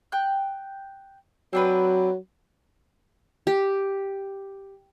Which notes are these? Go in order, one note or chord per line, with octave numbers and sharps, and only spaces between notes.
G5 F#6
F#3 C4 D4 B4
G4